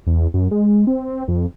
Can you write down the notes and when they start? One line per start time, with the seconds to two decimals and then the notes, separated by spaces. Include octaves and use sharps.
0.07 E2
0.34 F#2
0.51 G#3
0.87 C4
1.28 F2